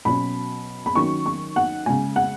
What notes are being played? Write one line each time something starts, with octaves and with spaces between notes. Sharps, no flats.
B2 F#3 C#4 B5
B5
D#3 F#3 C#4 C#6
C#6
F#5
C#3 G#3 C#4 G#5
F#5